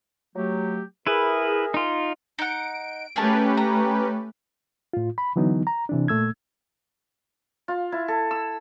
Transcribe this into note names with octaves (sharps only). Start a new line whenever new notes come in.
F#3 A3 G4
E4 G#4 A#4 B4 E5
D#4 F4
D#4 F#5 D7
A3 C#4 G4 G#4 A#4 B4 A5
A#5
A2 F4
B5
D3 E3 F#3 B3 D#4
A#5
C3 E3 D4
A#2 A3 E6 G#6
F4
E4
A4
E6